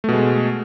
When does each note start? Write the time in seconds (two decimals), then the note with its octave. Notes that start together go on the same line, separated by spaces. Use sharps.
0.04 A3
0.08 B2
0.13 G#3